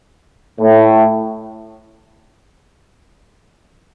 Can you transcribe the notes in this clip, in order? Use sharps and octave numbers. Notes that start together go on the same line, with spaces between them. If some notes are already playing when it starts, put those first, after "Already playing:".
A2